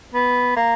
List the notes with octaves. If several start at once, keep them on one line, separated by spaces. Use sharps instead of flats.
B3
A#3